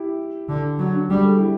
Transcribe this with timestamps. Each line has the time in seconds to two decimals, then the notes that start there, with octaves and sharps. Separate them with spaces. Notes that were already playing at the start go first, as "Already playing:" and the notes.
Already playing: E4 G4
0.49 D3
0.79 F#3 D4 F#4
0.95 D4 F#4
1.10 G3 G4
1.25 A4
1.38 E4 G4